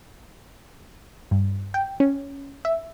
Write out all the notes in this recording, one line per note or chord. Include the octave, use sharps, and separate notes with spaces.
G2
G5
C#4
E5